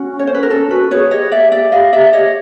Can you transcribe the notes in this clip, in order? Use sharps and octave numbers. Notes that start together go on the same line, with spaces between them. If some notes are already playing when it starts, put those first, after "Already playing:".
Already playing: C#4 F#4
C#5
C5
B4
A#4
C#4 A4
F#4 B4
G#4 B4 C#5
G4 C#5 D#5
D5 E5
D5 E5
D#5 F5
D5 E5
C#5 D#5